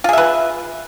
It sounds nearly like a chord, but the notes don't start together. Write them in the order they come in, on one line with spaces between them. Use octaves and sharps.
F4 G#4 E5 B4